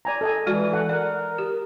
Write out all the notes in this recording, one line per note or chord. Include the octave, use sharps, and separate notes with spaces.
D5 G#5 A#5
A4 D#5 G#5
E3 G#3 F#4 D5
A4 F#5
A#4 D5 F#5
G4